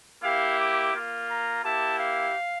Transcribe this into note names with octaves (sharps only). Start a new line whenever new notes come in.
A#3 E4 G4 F5
D6
A#3 F4
A#5
A#3 E4 G4 A5
F5